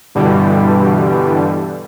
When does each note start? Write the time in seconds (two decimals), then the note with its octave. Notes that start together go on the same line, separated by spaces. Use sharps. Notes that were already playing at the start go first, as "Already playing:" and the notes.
0.15 G2 B2 D3 E3 G3